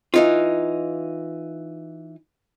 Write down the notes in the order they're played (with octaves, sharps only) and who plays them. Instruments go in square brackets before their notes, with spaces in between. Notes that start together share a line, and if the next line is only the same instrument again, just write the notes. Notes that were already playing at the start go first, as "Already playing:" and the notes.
[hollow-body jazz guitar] E3 D#4 F4